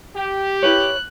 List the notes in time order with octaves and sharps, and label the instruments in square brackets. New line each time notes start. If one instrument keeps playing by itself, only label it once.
[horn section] G4
[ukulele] E4 B4 C#5 [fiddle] F#6